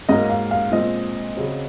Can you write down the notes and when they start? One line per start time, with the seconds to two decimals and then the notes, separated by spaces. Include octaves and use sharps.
0.09 G#2 F#3 A#3 D#5
0.30 F5
0.51 F5
0.72 A#2 G#3 C4 D#5
1.36 C#3 F#3 C4